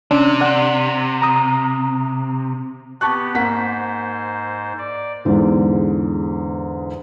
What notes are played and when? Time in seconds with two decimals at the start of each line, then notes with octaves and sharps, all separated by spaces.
0.11 C3 C#4 D4
0.41 D5 F#5
1.22 A#5 D#6
3.01 B3 G4 A5 C#6 F#6
3.34 G#2 A#3 C5 F#5 B6
4.78 D5
5.25 E2 G#2 D3